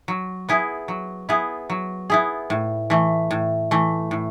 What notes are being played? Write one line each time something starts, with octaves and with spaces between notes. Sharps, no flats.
F#3
B3 E4 G#4
F#3
B3 E4 G#4
F#3
B3 E4 G#4
A2
E3 A3
A2
E3 A3
A2